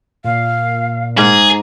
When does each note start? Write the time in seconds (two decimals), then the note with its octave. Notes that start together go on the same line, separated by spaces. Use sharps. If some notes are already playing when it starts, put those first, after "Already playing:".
0.24 A#2 F5
1.18 G#2 G#4 A#5